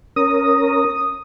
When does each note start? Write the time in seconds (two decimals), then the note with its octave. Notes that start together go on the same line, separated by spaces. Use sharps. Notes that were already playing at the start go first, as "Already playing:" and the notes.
0.16 C#4 A#4 D#6